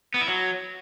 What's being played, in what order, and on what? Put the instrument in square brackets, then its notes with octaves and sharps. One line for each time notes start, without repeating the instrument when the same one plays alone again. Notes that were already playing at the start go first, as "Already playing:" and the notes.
[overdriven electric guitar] B3
E4
F#3